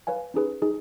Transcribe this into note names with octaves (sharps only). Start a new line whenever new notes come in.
B4 C#5 F5 G#5
C#4 D#4 G#4 B4
D#4 G#4